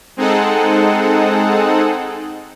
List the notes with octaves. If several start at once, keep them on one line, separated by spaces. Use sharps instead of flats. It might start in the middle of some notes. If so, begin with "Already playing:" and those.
G#3 C4 D#4 G#4 A4 F#5